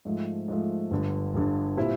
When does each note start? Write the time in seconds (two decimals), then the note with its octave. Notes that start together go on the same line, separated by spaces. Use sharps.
0.05 G#2 F3 A3
0.48 G#2 F3 A3
0.91 G1 G2 D3
1.34 G1 G2 D3
1.77 A#2 G3 C4 E4